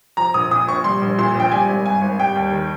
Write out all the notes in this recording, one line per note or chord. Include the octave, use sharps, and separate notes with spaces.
F3 A#5
A#1 D#6
A#2 D#6
A#1 C#6
G3 C6
A#1
A#2 C6
A#1 G5
G3 G#5
G#1
G2 G#5
G#1
G3 G5
D#2
D#3